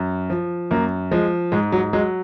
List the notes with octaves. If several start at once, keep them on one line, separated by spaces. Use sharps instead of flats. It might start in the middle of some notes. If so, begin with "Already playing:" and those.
Already playing: F#2
F3
F#2 A#3
F3 G#3
G#2 G#3
F#3
F#3 G#3